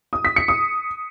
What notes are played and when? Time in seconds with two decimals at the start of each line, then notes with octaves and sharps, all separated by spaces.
0.13 D#6
0.25 B6
0.36 C#7
0.48 D#6